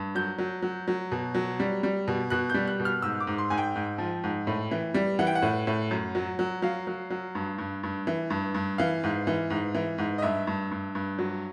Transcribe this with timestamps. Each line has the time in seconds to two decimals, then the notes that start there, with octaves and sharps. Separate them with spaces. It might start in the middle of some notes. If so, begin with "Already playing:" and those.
Already playing: G2
0.15 F#3 G6
0.38 F#3
0.62 F#3
0.88 F#3
1.12 B2
1.35 F#3
1.60 G3
1.83 G3
2.08 B2
2.30 B2 F#6
2.50 G3 G6
2.68 F#6
2.80 B2
2.85 F6
3.02 G#2 E6
3.20 D6
3.27 G#2
3.38 C6
3.50 G#2 G#5
3.58 G5
3.76 G#2
3.98 F3
4.24 G#2
4.47 A2
4.71 E3
4.94 G3
5.19 E3 F#5
5.27 G5
5.35 F#5
5.42 A2
5.67 A2
5.91 F#2
6.15 F#3
6.39 F#3
6.62 F#3 F5
6.87 F#3
7.10 F#3
7.35 G2
7.58 G2
7.83 G2
8.07 E3
8.30 G2
8.54 G2
8.78 E3 F5
9.03 G#2
9.27 E3
9.50 G#2
9.75 E3
9.98 G#2
10.18 D#5
10.22 G2 E5
10.47 G2
10.71 G2
10.95 G2
11.18 F#3